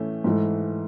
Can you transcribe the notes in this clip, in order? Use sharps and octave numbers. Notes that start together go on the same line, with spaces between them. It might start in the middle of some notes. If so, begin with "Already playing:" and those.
Already playing: A2 E3 A3 C#4
G#2 E3 A3